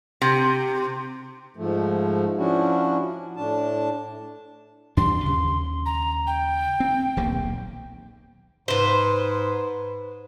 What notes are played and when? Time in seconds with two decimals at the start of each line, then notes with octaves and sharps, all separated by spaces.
0.22 C3
1.55 G#2 F3 A3
2.37 F3 C#4 D4 E4 F#4
3.37 A2 D4 A5
4.97 E2 G2 D4 C6
5.26 D#2 C#3
5.86 A#5
6.27 G5
6.80 C4
7.17 D#1 B1 A#3
8.68 G#2 B4 C5